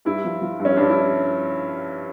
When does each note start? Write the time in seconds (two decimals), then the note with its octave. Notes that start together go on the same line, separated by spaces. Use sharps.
0.05 G2 E4
0.24 F3
0.41 F3
0.59 G2
0.65 C#4
0.77 G2 D4
0.89 E4